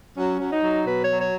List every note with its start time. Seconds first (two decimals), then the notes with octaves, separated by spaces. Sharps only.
0.17 F#3 C#4
0.40 F#3
0.52 D#4
0.63 F#3
0.86 B2 B4
1.03 C#5
1.09 F#3
1.20 C#5